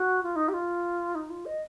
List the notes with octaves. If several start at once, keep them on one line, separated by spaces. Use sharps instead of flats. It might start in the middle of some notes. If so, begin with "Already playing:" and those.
Already playing: F#4
F4
D#4
G4
F4
D#4
F4
D#5